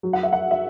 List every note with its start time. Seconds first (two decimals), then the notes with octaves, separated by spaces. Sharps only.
0.03 F#3
0.13 F#5
0.23 E5
0.33 F#5
0.51 E5